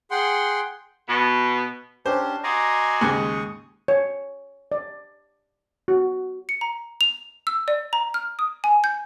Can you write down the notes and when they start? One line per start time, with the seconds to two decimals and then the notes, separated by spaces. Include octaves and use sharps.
0.11 G#4 F#5 G5 C6
1.08 B2
2.06 C#4 D4 G4 C5
2.44 F#4 D5 D#5 G#5 A#5 C6
3.01 D#2 G#2 C#3 C#6 D#6
3.88 C#5
4.72 D5
5.88 F#4
6.49 C#7
6.61 A#5
7.01 F7
7.47 E6
7.68 D5
7.93 A#5
8.14 F6
8.39 D#6
8.64 G#5
8.84 G6